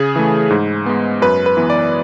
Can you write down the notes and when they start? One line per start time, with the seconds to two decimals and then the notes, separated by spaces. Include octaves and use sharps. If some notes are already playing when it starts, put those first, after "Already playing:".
Already playing: C#3 G#4
0.16 E3 A3
0.50 G#2
0.86 G#3 B3
1.22 F#2 B4
1.46 B4
1.57 E3 B3
1.70 D5